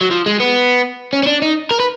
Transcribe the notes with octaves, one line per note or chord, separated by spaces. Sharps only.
F#3
F3
G#3
B3
C#4
C#4
D4
D#4
A#4
B4